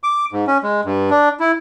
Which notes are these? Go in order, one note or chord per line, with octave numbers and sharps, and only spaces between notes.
D6
G#2
C#4
G#3
G2
D4
E4